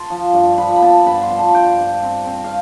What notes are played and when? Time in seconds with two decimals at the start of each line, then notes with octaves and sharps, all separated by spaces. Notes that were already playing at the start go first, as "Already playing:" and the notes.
Already playing: A5 C6
0.10 F3
0.33 G2
0.58 F3 B5
0.76 B5
0.82 B3 A5
1.06 G2 B5
1.22 C6
1.31 F3
1.39 A5
1.54 G2 G5
1.78 G2
2.03 C4
2.26 C4
2.44 F5